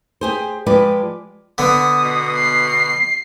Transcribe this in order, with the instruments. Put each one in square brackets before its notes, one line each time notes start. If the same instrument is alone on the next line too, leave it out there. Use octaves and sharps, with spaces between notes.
[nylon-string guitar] G4 G#4 C5
F3 G#3 G4 B4 D5
[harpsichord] D3 B3 [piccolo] D#6
[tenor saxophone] B2
[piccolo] C7